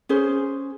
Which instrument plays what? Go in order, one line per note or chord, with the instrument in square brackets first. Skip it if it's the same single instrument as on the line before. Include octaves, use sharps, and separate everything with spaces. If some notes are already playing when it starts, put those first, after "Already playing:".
[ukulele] C#4 G#4 C5